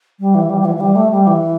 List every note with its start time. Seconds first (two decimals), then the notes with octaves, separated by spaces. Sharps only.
0.20 G3
0.35 E3
0.50 G3
0.61 G3
0.65 E3
0.76 E3
0.80 G3
0.95 A3
1.11 G3
1.27 E3